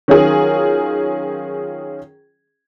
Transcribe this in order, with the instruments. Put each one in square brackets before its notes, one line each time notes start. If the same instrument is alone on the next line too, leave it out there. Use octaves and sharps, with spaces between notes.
[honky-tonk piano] D#3 F#3 C#4 F4 G#4 A#4